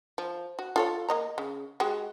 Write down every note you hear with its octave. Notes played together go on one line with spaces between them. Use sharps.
F3
F#4
F4 A4 C#5
A#3 D#5 A#5
C#3
G#3 F#4 G4